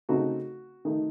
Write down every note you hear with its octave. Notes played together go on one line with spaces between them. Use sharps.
C#3 A3 C4 D#4 F#4
D#3 A3 D#4